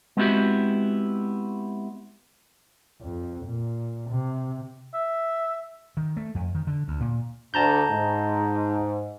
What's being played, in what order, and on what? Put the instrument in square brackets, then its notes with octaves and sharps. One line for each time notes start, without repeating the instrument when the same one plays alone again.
[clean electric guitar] G#3 B3 C4 E4 F#4 G4
[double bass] F2
A#2
C3
[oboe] E5
[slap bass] D#3
A3
F2
D#3
D3
D2
A#2
[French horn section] D2 [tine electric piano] A5 A#5 G6
[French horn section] G#2